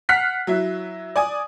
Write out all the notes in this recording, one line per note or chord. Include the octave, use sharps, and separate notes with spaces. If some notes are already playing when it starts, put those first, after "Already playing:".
F#5 F6 F#6 B6 C7
F#3 E4
D5 G#5 D#6